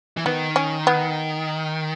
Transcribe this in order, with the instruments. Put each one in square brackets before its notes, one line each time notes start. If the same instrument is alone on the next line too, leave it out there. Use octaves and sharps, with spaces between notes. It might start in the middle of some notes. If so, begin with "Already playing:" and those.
[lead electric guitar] E3
[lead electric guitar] D#3 [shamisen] B3
[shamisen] C#4
B3